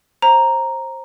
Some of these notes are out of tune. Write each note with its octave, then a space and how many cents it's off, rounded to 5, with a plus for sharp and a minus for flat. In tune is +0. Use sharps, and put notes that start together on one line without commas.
C5 +25 A#5 +0